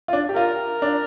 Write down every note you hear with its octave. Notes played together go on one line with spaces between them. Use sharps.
F4
D4
G4
F4 A#4
D4